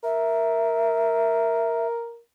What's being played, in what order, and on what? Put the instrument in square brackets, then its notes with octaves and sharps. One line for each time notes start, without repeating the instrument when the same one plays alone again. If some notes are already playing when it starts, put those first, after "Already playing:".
[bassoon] A#4 [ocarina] E5